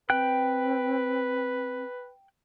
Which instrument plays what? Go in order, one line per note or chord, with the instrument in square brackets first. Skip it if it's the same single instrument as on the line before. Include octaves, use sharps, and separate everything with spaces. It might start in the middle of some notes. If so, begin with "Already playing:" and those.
[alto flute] C4 [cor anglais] B4 [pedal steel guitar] G5 F#6